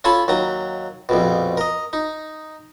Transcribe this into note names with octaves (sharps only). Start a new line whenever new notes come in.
C#4 F4 A4 G#5 A5 B5
D#2 F#3 A#5
A#1 F2 B2
A#4 D#5
D#4